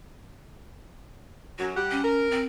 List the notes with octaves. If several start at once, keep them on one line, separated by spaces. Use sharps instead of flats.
F#2 F#3 F#4
G3 G4 F#5
C#4
A#4
C4